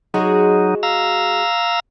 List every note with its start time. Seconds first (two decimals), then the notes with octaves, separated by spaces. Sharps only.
0.14 F#3 G#3 D#4 F#4 G#4
0.83 F5 A#5 E6